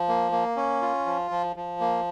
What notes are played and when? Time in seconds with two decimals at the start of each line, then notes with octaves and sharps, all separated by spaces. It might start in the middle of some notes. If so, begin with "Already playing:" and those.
Already playing: F3
0.08 A#3
0.32 A#3
0.57 C#4
0.82 F4
1.06 F3
1.31 F3
1.56 F3
1.80 A#3